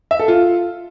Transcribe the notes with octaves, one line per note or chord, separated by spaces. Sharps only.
E5
A4
F4